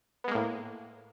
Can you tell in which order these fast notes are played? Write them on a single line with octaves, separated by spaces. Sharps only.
B3 G#3 A#3 A2